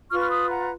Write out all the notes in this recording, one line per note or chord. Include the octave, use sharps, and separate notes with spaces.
F4 B4 C#6 F6
F6
B5 D#6
F#5 A#5